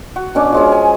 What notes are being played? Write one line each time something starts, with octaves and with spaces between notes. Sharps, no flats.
F#4
B2 C#4 D4 D6
F3 G#3 C#4
G#5